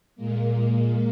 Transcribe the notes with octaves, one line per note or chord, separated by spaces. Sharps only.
A#2 G#3 A#3